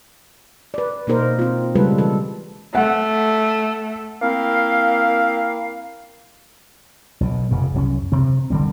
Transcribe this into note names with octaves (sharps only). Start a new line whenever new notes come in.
B4 D5
B2 A#3 D#4 A#4 C5
C4 F4
C#3 G3 G#3 F4 A4 B4
E3 A4
A3 F#5
A#3 C4 E4 F5
B1 B2
F1 F#2 C#3
C2 F#2 C4 C#4
C3 C4
F#1 D3 G3 C4